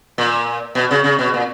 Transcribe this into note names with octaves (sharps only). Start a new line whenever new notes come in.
A#2
B2
C#3
C#3
B2
A#2